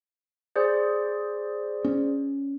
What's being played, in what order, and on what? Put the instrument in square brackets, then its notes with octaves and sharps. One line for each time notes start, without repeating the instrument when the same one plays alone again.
[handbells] G#4 C5 D5
[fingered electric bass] C#4